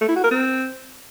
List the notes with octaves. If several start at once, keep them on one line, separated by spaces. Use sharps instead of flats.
A3
E4
F#4
A#4
C4